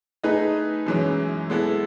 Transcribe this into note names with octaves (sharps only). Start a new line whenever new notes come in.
A3 D#4 G#4 B4 D#5
F#2 E3 G#3 C#4
G#3 B3 E4 A4